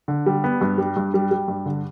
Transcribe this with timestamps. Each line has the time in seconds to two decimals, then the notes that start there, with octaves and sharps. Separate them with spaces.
0.08 D3
0.26 G3
0.44 B3
0.61 G2
0.78 G3
0.96 G2
1.14 G3
1.31 G3
1.48 G2
1.66 D3